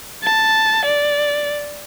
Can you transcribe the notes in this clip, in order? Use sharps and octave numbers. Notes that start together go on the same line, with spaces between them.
A5
D5